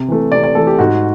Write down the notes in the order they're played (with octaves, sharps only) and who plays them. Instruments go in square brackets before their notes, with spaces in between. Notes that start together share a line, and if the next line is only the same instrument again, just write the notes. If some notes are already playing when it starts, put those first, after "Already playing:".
Already playing: [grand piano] C3
E3 A3
C3 D5
D5
E3 A3 A4
G4
G#2 F#4